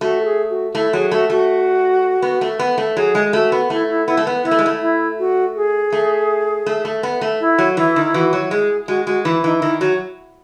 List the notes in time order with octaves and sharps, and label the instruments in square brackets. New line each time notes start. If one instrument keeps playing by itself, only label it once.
[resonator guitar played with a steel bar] A3 [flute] F#4
[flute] A4
G#4
F#4
[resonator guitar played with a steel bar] A3 [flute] E4
[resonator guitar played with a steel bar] F#3 [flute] G#4
[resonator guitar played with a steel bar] A3 [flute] F#4
[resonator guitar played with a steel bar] A3 [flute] F#4
[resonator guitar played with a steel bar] B3
A3
B3
A3
[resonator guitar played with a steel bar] F#3 [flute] G#4
[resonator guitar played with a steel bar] G#3
[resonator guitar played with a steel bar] A3 [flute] F#4
[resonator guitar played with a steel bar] B3
[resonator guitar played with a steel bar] A3 [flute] E4
[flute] E4
[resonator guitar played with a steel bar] B3 [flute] E4
[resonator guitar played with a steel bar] A3
B3
[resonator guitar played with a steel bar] B3 [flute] E4
[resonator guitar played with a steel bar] A3
G#3
A3
[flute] E4
F#4
G#4
[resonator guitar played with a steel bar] A3
A3
A3
B3
A3
[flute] E4
[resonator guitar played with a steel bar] F#3
[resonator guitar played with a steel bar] E3 [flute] E4
[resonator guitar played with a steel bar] D#3
[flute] E4
[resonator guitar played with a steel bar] E3 [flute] F#4
[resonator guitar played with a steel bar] F#3
[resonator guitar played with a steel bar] G#3 [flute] G#4
[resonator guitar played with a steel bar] G#3 [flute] F#4
[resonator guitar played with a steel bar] G#3 [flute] F#4
[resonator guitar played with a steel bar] E3
[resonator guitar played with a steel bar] E3 [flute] D#4
[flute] D#4
[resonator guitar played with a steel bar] D#3 [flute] E4
[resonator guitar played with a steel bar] F#3 [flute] F#4